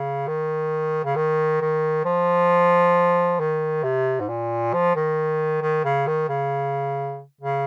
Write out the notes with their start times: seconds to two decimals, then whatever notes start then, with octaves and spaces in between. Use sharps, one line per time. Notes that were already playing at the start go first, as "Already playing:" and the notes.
Already playing: C#3
0.27 D#3
1.04 C#3
1.15 D#3
1.61 D#3
2.05 F3
3.40 D#3
3.83 C3
4.20 G#2
4.28 A#2
4.73 F3
4.96 D#3
5.62 D#3
5.84 C#3
6.07 D#3
6.29 C#3
7.41 C#3